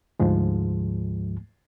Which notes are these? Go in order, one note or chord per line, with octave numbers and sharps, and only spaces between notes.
D2 G#2 F3 G#3